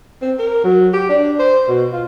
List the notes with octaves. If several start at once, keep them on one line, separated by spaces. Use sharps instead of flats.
C4
A#4
F#3
G4
D4
C5
B2
F4